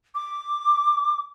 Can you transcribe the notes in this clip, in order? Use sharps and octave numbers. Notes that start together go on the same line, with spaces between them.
D6